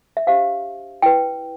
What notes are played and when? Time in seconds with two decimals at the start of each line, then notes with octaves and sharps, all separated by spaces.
0.17 E5
0.27 D4 G4 C5 F5
1.02 E4 B4 G5